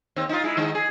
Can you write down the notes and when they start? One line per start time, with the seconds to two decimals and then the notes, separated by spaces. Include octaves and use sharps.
0.16 D#2 C4
0.29 D#4 F4
0.44 G#3 E4
0.57 D#3 G#3 D#4
0.75 G#4